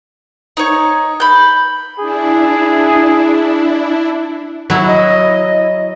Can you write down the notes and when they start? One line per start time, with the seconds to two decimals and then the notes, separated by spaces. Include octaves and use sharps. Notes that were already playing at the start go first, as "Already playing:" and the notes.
0.57 D#4 C#5
1.20 B5 G6
1.99 D4 E4 G#4
4.70 F#3 E4 F#4
4.87 D#5